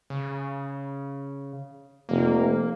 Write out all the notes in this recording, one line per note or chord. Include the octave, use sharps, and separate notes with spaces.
C#3
F1 A#3